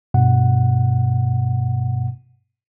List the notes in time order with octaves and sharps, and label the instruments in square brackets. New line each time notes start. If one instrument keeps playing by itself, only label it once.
[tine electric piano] G2 B2 F#5